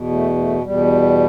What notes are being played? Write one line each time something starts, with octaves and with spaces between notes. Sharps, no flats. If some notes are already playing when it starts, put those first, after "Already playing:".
Already playing: E2 B2
A3
A3
E2 B2 G3